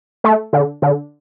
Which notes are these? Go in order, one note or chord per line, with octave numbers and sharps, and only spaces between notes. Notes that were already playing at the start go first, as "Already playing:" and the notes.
A3
D3
D3